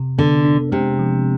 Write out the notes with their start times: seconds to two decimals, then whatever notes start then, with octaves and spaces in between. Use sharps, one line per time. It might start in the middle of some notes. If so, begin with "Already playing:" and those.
Already playing: C3
0.18 D3 B3
0.45 D4
0.72 C3 G#3
0.99 F3